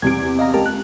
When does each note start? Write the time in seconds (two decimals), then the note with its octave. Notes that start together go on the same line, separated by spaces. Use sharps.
0.02 E2 C3 G#6 D7
0.39 D#5 F5 A#5
0.54 C#2 G4 A#4 A5
0.66 F#6